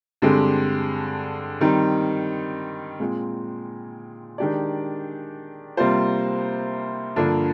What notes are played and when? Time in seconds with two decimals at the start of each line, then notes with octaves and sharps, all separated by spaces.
0.22 G2 D3 G#3 C4 G4
1.61 D#3 G3 C4 D#4
2.99 A#2 G#3 C4
4.38 D#3 G#3 D4 G4 D5
5.77 C3 G3 A#3 F4 C5
7.16 G2 D3 F3 A#3 D4